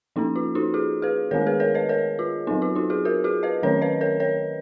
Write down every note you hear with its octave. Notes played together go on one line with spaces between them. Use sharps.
F3 A#3 C#4 D#4
F4
D#4 F#4
F4 G#4
G#4 B4
D#3 G#3 B3 A#4 C#5
G#4 B4
A#4 C#5
B4 D#5
A#4 C#5
F4
F#3 B3 D#4
F4
D#4 F#4
F4 G#4
F#4 A#4
F4 G#4
B4 D#5
D#3 F#3 C#4 A#4 C#5
B4 D#5
A#4 C#5
A#4 C#5